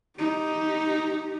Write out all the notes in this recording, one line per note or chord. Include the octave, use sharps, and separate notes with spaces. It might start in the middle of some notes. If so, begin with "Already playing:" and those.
D#4 G4